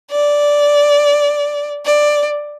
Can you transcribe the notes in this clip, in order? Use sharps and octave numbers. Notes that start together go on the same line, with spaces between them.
D5
D5